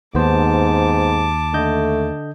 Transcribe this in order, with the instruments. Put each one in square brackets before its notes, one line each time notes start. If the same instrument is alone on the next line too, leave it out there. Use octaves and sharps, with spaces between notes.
[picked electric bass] D#2 [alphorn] G#2 [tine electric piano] B3 C5 [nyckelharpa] A5 D6
[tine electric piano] D3 D#5 G6 [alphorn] A3